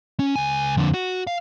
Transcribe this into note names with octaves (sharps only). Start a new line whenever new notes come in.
C#4
C#2 G#5
F2 D3
F#4
F5